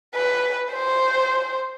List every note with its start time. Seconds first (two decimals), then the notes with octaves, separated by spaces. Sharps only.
0.15 B4
0.72 C5